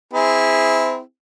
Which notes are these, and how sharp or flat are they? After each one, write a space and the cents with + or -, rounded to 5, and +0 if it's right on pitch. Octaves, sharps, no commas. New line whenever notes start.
C4 -25 E4 -15 G#4 -15